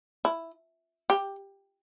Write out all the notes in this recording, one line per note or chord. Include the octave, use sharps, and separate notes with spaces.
E4
G4